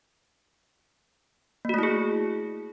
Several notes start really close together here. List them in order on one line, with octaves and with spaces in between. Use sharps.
A#3 F#4 A3 E4 G#4